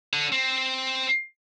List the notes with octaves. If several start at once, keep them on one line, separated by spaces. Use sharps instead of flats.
D3
C4